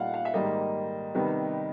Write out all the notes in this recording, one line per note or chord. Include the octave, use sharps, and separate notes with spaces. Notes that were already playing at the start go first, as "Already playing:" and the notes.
Already playing: A#2 G3 B3 D#4 F5 F#5
F5
E5
G#2 D#3 G3 A#3 D#5
C3 D#3 G3 B3 D#4